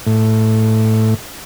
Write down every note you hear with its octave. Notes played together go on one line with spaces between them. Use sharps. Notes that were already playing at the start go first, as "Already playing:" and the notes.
A2